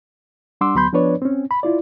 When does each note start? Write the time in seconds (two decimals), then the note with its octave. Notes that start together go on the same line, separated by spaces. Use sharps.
0.61 G3 D4 F#5 C6 D6 E6
0.75 D2 F#3 B3 B5 C6 G6
0.93 F3 B3 D4 B4 C#5 D5
1.22 C4 C#4
1.51 B5
1.63 E4 F4 D5